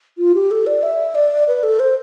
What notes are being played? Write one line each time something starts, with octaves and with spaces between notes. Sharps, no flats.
F4
G4
A4
D5
E5
D5
B4
A4
C5